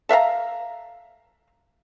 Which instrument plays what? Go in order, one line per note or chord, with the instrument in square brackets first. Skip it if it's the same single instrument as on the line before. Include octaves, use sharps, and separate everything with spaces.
[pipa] A4 E5 F5 A#5